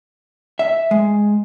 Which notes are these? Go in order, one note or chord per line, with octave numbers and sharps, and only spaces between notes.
E5
G#3